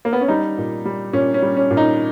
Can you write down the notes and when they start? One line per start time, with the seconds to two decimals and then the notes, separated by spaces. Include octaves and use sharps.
0.05 A#3
0.13 B3
0.21 C#4
0.28 G3 D#4
0.58 A#2
0.85 G3
1.13 A#2 C#4
1.34 C#4
1.42 G3
1.57 C#4
1.70 A#2
1.77 D#4